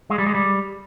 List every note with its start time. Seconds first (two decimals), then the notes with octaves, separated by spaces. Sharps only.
0.10 G#3
0.18 G3
0.26 G#3
0.35 G3